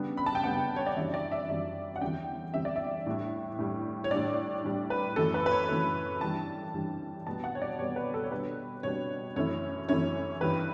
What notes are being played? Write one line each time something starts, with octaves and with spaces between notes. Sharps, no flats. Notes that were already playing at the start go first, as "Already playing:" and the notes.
Already playing: C#3 G3 B3 D4
B5
A5
G5
C#3 G3 B3 D4 F#5
C#5
D5
F#2 E3 G3 D4 E5
D5
E5
F#2 E3 G3 D4 E5
F#5
E2 D3 G3 C#4 G5
E2 D3 G3 C#4 E5
D5
E5
A2 G3 D4
A2 G3 D4
C#5
A2 G3 D4 D5
A2 G3 D4
B4
F#2 E3 A3 A4
B4
B4
C#5
F#2 E3 A3
G2 E3 G3 D4 A5
G2 E3 G3 D4
B2 G3 B3 A5
F#5
C#5
D5
B2 G3 B3 C#5
B4
A4
C#5
B2 G3 D4 B4
B2 G3 D4 C#5
F#2 E3 A3 C#4 E4 C#5
F#2 E3 A3 C#4 E4 C#5
G2 E3 G3 B4